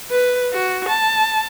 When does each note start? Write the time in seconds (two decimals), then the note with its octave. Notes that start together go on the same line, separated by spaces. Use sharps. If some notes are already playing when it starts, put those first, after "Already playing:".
0.10 B4
0.53 F#4
0.89 A5